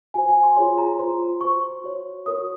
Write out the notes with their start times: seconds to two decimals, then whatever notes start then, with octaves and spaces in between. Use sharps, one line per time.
0.14 F#4 C5 G#5
0.29 G#5
0.43 C6
0.56 F4 G#4 C#5 C6
0.78 A#5
0.99 F4 C5 C6
1.41 F#4 C5 C#6
1.84 F#4 C#5
2.26 F#4 A#4 C#5 D#6